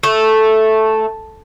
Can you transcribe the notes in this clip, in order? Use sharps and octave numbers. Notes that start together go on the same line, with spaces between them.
A3